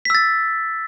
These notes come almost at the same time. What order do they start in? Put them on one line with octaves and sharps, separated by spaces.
B6 E6 A6